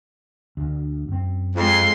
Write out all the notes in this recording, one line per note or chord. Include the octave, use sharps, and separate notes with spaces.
D2
F#2 C4
F2 G#3 C6